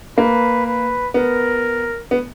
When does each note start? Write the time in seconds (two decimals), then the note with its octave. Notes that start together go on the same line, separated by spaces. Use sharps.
0.18 A#3 B4
0.66 B4
1.14 B3 A#4
2.11 B3